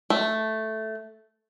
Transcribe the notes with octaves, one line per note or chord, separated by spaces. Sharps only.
A3